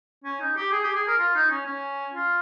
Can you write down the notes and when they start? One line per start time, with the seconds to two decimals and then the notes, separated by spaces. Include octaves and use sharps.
0.24 C#4
0.40 D#4
0.56 G4
0.72 G#4
0.84 G4
0.95 G#4
1.07 A#4
1.19 F4
1.36 D#4
1.50 C#4
1.66 C#4
2.14 F4